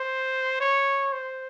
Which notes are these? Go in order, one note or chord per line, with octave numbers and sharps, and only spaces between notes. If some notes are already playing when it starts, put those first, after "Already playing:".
Already playing: C5
C#5
C5